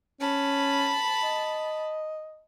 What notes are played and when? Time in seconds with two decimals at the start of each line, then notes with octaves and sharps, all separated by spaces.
0.21 C#4 A5 B5
1.23 D#5